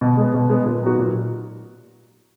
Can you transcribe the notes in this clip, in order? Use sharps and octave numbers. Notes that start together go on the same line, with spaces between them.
B2
G#3 B3
B2
G#3 B3
A#2
F#3 B3 D#4 F#4
A#2